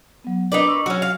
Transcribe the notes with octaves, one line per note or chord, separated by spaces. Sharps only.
F#3 B3
D4 D#4 A#4 B4 D5
C#6 E6
F#3 C#4 F#4
F5